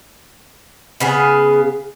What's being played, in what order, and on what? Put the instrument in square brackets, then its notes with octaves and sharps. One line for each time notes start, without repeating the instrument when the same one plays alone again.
[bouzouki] C#3 B3 G#4